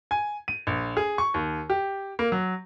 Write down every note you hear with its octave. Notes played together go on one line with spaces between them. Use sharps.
G#5
D#7
A#1
G#4
C#6
D#2
G4
A#3
F#3